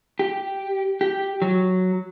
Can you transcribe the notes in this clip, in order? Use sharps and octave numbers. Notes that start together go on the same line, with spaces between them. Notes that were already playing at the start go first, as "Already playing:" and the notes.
G4
G4
F#3